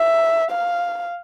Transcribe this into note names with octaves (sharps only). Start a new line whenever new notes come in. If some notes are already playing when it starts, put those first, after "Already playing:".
Already playing: E5
F5